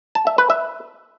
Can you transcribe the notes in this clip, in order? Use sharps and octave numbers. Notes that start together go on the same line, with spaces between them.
A5
E5
B4
E5